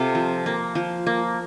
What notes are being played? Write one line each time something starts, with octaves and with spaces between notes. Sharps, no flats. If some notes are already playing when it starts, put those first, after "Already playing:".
Already playing: C3 F4 A4
F3
A#3
F3
A#3